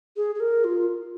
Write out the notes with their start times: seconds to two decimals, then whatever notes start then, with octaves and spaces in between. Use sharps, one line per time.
0.16 G#4
0.35 G#4
0.40 A#4
0.64 F4